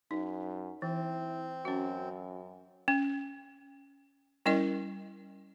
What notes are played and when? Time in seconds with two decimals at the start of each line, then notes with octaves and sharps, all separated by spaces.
0.11 F#2 D#4
0.82 E3 C4 E4
1.65 F#2 C#4 F#4
2.88 C#4
4.46 G3 C#4 E4 A#4 D#5